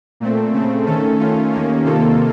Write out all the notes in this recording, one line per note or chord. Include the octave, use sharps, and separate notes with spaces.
A#2 A3 C4
C#3 A3 C4
D#3 A3 C#4 A4
D#3 A3 C#4 F4
D#2 D#3 A#3 C#4
C3 D#3 A#3 F4 A4